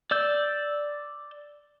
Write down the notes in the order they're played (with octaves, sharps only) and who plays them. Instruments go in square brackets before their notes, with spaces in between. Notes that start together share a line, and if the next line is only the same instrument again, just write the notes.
[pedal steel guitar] D5 E6 G6